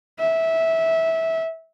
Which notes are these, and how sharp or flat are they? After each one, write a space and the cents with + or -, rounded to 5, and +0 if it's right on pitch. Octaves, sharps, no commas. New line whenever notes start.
E5 -15